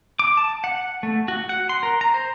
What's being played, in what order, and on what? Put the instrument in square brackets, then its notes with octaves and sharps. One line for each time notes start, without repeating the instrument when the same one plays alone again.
[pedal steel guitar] D6
A5
F#5
A3
F#4
F#5
C6
A#4
A#5
C5